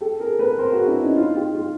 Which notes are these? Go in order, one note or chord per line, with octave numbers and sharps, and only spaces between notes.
G4 A4
G#4 A#4
A4 B4
A#4 C5
F#4 G#4
D4 E4
C#4 D#4
D#4 F4
F4 G4
F4 G4